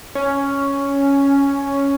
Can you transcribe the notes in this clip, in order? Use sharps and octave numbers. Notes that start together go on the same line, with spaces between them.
C#4